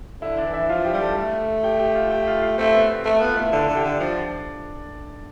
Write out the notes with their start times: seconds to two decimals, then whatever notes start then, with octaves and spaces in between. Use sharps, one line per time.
0.22 D3 E4 E5
0.38 D4 D5
0.45 E3
0.54 E4 E5
0.69 F3 F4 F5
0.85 G4 G5
0.93 G3
1.01 A4 A5
1.17 A3
1.63 G4 G5
1.79 G4 G5
1.95 F4 F5
2.11 G4 G5
2.27 F4 F5
2.42 F4 F5
2.58 A3 C4 C5
2.74 B3 B4
2.90 C4 C5
3.05 A3 A4 A5
3.21 B3 F4 F5
3.37 A3 E4 E5
3.52 D3 A4 A5
3.68 D3
3.76 G4 G5
3.84 D3
4.00 F3 D4 D5